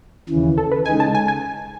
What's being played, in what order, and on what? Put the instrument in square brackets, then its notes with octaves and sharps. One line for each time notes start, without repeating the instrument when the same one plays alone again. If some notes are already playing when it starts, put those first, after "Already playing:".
[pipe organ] D#2 C#3 E3
[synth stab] A4
B4
[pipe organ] C#3 G#3 D#4 [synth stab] G#5
[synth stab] A5
G#5
G#5